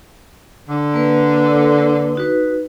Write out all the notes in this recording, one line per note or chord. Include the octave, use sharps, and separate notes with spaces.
D3
A#3 B4
D#4 F#4 B4